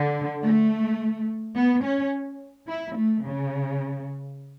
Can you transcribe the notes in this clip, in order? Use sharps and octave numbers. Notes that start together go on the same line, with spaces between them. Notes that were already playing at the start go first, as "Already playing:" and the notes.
Already playing: D3
A3
B3
C#4
E4
A3
C#3